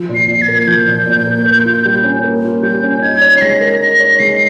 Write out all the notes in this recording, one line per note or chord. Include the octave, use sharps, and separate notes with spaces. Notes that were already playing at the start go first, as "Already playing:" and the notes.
Already playing: F3
A#2
C7
A#2
G#6
A#3
G#6
F3 G6
A#2
A#2
A#3
A#3
F4
G3
C#4
A#3
F4
G3 G6
C#4
D#4 G#6
C#5
C7
G#3 A#6
A#4
D#4 A#6
C#5
G#3 C7